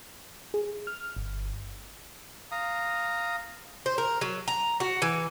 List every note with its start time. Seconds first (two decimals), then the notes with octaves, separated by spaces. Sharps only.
0.54 G#4
0.87 F6
1.16 G1
2.51 F5 A#5 D#6
3.86 C5
3.98 A#4
4.21 F#3
4.48 A#5
4.80 F#4
5.02 E3